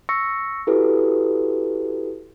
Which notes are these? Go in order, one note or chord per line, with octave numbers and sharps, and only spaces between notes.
C#6 E6 A#6 C#7
E4 F#4 G4 A4 B4